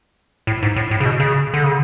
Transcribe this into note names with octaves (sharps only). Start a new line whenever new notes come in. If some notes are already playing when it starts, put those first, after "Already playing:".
A2
G#2
A2
A2
C#3
B2
C#3
D3
C#3